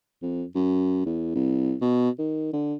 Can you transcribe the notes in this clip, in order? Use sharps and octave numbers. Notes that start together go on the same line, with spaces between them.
F2
F#2
E2
C2
B2
D#3
D3